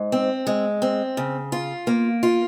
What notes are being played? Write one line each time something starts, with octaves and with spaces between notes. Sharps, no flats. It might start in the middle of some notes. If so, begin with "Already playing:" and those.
Already playing: G#2
C4
G#3
C4
C#3
F4
A#3
F4